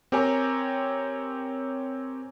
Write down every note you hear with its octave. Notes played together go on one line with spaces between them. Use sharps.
C4 G4 A#4 C#5 G#5 A#5